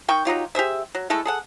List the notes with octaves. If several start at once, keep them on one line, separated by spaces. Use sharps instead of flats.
D#3 G5 C#6
F#3 D#4 F4 G4
G4 G#4 C5 E5
F#3
G#3 A3 E4 A4
G#4 A4 F#5